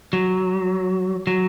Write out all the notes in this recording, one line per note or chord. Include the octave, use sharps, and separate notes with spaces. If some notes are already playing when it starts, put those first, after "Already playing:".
F#3
F#3